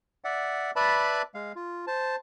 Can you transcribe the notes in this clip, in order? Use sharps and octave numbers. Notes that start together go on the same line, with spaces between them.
D5 E5 F#5
B4 D5 E5 A5 B5
G#3 F5
F4
C5 A5